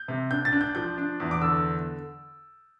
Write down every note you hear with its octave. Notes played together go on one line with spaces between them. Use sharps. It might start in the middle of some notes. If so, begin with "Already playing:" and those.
Already playing: G6
C3
D4 G6
A6
D4
G6
F3 G6
D4
E2
D6
D3 E6